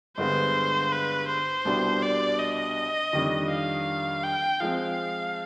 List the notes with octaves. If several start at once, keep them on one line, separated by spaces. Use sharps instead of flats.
G2 D3 G#3 B3 C5
B4
C5
C2 B2 G3 D4
D5
D#5
F2 D#3 G3 D4
F5
G5
F3 G#3 C4 F5